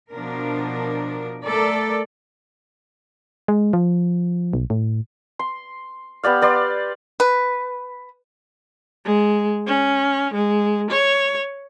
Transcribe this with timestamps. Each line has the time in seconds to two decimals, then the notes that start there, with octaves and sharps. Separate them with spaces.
0.11 B2 F3 D4 A#4
1.44 A3 A4 A#4 D5
3.48 G#3
3.73 F3
4.53 B1
4.70 A2
5.39 C6
6.23 B3 G4 D5 F5
6.42 B4 D5 F5 C6
7.20 B4
9.05 G#3
9.66 C#4
10.34 G#3
10.91 C#5